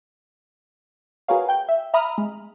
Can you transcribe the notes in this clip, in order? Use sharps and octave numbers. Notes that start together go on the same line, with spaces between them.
F#4 G#4 A#4 B4 C#5 F5
G5 G6
E5
E5 A#5 B5 D#6 F6
G#3